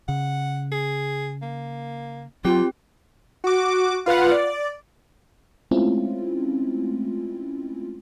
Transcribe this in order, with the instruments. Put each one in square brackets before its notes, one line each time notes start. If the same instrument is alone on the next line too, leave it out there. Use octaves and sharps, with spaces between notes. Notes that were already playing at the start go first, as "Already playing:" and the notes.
[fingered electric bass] C#3 [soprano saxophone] F#5
[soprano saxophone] G#4
A#3
[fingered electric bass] F#3 [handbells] C4 G4 [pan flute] F4 [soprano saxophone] G5
[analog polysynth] F#4 D6
F4 B4 F5 F#5
D5
[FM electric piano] G#3 A3 C4 C#4 E4 F4